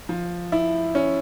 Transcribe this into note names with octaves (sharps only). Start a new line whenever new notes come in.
F3
E4
C#4